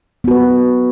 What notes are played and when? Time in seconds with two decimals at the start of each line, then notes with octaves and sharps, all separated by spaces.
0.24 B3
0.28 F#4
0.31 B4